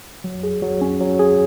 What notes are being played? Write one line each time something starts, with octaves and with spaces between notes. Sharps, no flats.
F#3
G#4
F#3
C#4
F#3
G#4